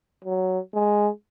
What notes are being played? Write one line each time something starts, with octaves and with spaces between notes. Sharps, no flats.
F#3
G#3